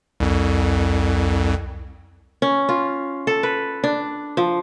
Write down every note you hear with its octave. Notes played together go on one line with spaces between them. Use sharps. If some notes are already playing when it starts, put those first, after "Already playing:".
C2 F2
C#4
F4
A4
B4
D4
F3